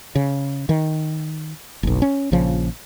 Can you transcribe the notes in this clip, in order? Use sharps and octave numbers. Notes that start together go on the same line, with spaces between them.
C#3
D#3
F#1 B1
C#4
A#1 C#3 F3